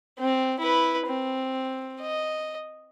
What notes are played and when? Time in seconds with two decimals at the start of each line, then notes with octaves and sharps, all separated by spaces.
0.19 C4
0.60 E4 B4
1.06 C4
2.02 D#5